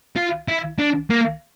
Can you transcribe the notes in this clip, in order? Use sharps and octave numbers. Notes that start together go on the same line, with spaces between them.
F4
E4
D4
A#3